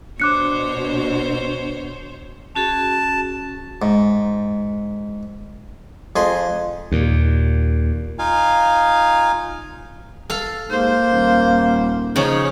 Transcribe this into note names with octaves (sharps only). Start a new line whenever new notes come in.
B2 D4 C5 C#5 D6 F#6 C#7
C#4 F#4 G#4 A5
G#2
F2 G#4 C6
D#2 A#2
D#4 F4 F5 G#5
A4 F5
G#2 A#3 C5
D#1
C#3 F3 D#4 G#4 C#5